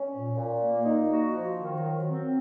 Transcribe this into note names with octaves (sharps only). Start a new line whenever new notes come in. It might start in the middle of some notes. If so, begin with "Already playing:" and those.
Already playing: C#4
A#2
A#2
A#3
D#4
F#4
F3
D#3
F#3
C4